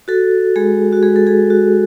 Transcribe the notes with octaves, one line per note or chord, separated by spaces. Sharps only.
F#4 A4
G#3 G#4
F#4
G#3 G#4
A4
G#4
F#4